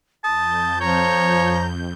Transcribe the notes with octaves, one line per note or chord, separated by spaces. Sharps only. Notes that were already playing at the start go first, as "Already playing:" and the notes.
F2 A5 D#6 G6
F3 C#5 A#5